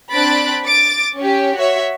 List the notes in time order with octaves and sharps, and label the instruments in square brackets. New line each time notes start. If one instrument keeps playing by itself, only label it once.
[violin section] C4 D4 B5 F#6 A6 D7
D6 A6 D7
C#4 G4
F#4 C#5 E5